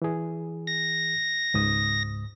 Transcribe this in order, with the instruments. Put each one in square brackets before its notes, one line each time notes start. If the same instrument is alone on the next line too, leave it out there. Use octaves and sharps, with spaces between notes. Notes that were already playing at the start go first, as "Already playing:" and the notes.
[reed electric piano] E3 G#4
[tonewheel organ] A#6
[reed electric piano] C#2 G#2 D#6